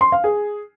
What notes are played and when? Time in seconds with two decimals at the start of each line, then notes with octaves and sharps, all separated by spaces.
0.01 C6
0.12 F5
0.24 G#4